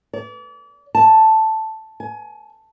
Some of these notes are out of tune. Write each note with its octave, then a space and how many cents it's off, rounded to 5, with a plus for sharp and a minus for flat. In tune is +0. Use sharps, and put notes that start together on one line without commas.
D5 -35
A5 +0
G#5 +25